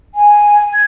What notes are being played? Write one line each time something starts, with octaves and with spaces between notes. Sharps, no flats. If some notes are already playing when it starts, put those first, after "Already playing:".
G#5
G#6